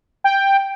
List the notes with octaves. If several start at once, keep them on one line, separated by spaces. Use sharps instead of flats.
G5